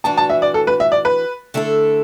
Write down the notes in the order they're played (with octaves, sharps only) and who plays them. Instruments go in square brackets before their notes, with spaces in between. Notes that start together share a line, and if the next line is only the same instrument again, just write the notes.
[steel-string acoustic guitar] E3 D4 F#4 [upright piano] A5
[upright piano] A5
E5
D5
A4
B4
E5
D5
B4
[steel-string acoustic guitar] D3 A3 E4 A4